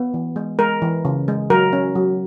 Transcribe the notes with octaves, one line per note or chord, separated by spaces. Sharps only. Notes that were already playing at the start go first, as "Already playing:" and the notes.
Already playing: B3
E3
G#3
G#3 A#4
E3
C#3
G#3
F#3 A#4
C#4
F#3